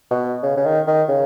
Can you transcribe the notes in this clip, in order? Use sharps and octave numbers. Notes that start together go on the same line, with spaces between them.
B2
C#3
C#3
D#3
D#3
C#3